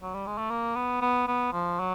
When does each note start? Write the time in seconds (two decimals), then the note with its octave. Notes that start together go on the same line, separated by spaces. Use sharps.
0.02 F#3
0.14 G3
0.27 G#3
0.38 A3
0.50 A#3
0.75 B3
1.01 B3
1.28 B3
1.53 F3
1.79 F#3